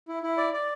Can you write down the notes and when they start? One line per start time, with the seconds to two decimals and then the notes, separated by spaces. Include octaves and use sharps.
0.08 E4
0.23 E4
0.38 D5
0.53 D5